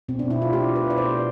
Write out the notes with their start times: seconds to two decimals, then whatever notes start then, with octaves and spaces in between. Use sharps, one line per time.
0.09 B2 C4
0.19 D4
0.30 B2 E4
0.42 F4
0.53 A3 G4
0.75 A3 B4
0.90 D5
0.97 B2 C5